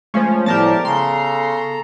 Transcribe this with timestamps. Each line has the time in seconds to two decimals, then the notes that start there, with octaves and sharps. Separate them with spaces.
0.14 F3 G#3 A3 C#4 C5
0.46 A2 F3 G3 B3 G4 A#4 A5
0.85 C#3 A4 A#5 C6